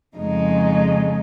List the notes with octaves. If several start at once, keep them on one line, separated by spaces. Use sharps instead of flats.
F2 C#3 G#3 D#4